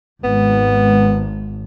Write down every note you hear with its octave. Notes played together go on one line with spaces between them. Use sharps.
G#1 B3